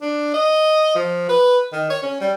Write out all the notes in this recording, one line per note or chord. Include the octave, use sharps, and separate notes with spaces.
D4
D#5
F3
B4
D#3
C#5
C#4
G3